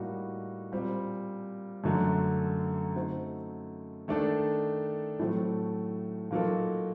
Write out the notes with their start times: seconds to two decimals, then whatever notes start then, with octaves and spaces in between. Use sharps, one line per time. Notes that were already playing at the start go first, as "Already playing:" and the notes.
Already playing: A2 G3 A#3 D#4 F#4
0.72 A#2 G3 C4
1.84 F#2 D3 F#3 A3
2.95 A3 C4 D#4 F#4 C5
4.08 D#3 A3 D4 A4
5.19 A2 F#3 A3 C4
6.31 A#2 F#3 A#3 D#4 A4